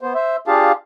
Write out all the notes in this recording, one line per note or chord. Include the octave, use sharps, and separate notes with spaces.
B3 C5
C5 E5
D4 F4 G4 G#4 F5 A5